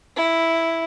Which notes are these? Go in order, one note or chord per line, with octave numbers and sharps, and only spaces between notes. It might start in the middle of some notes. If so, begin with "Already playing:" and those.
E4